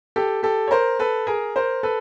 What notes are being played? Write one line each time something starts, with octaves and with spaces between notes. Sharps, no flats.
G4 A4
G4 A4
C#5
A#4 C5
A4 B4
G#4 A#4
A#4 C5
A4 B4